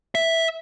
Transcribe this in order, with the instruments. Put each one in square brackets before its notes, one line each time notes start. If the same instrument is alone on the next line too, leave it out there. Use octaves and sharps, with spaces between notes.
[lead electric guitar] E5